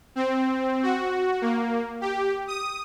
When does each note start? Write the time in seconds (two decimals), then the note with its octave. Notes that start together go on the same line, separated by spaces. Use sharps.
0.16 C4
0.83 F#4
1.42 A#3
2.01 G4
2.47 D#6